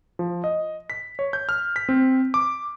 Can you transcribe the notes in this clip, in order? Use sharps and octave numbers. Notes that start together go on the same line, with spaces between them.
F3
D#5
B6
C#5
G6
F6
B6
C4
D6